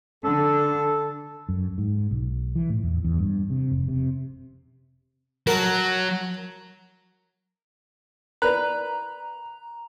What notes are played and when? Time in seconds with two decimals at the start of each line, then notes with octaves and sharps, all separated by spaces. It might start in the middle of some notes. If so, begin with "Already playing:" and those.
0.25 D3 A4
1.49 F#2
1.78 G#2
2.11 B1
2.56 E3
2.70 A2
2.83 E2
3.04 E2
3.19 G2
3.50 C3
3.71 F1
3.89 C3
5.47 F#3 A#4 A5
8.42 A#4 B4 D5 A#5